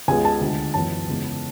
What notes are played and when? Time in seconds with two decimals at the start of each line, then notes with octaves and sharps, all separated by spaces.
0.08 C#2 C#3 G#3 B3 G#5
0.25 A5
0.41 D2 D3 G#3
0.74 F#2 E3 B3 A5
1.08 E2 C#3 G#3 B3